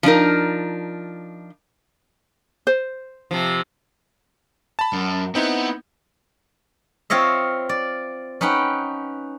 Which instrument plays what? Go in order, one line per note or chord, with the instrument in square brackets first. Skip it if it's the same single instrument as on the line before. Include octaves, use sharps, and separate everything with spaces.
[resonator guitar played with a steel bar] F3 D4 D#4 A#4
[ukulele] C5
[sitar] C3 F3
[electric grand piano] A5 B5
[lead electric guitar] F#2
[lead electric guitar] B3 [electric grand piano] C4 D#4 E4
[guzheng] C4 F4 C#5 D#5 E5
D5
C#4 D#4 B4 F#5 G5